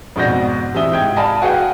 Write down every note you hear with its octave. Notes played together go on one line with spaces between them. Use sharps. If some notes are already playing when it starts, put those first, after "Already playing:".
F2 G#2 B2 D5 G6 A#6
C3 E3 E5 D#6 G7
G#2 G5 G#6
D5 D#5 F5 G#5 A5 B5
F#4 G#4 B4 F5 G5